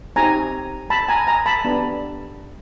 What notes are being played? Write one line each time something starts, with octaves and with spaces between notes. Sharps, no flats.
C4 D#4 G4 G#5 A#5
A5 B5
G#5 A#5
G#5 A#5
A5 B5
B3 D4 G4